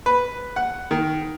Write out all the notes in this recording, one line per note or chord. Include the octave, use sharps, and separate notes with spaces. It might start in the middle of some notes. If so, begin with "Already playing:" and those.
B4
F#5
D#3